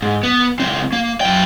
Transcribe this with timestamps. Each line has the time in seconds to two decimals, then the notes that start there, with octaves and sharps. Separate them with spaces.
0.02 G#2
0.23 B3
0.59 C#2 C4
0.92 A#3
1.21 F#2 G5